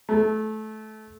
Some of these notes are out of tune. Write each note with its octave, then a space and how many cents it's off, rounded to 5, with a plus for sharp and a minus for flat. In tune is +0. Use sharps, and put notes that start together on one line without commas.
A3 -20